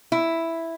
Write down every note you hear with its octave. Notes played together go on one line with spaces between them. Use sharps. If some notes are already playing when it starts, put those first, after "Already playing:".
E4